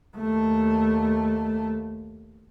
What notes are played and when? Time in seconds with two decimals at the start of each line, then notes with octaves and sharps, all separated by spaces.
0.17 D#2 A3